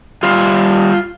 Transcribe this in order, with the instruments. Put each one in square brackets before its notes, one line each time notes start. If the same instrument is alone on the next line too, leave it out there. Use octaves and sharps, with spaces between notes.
[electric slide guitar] G3 F4